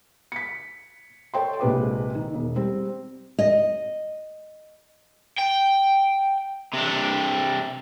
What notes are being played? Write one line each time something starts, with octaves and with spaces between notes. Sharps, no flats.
B6 C#7
A4 C#5 G5 C6
A#1 C3 G#3 B4 D6
D#3
E1
G3 C4
D#5
G5
C3 D4